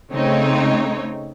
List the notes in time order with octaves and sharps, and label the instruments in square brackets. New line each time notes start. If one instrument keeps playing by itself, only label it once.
[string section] C#3 A3 C4 D#4 C#5